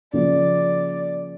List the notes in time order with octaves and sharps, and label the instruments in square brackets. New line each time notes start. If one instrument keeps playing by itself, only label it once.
[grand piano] C#3 F3 A#3 [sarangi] D5